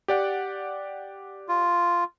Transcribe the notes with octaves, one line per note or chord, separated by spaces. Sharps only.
G4 D5 F#5
F4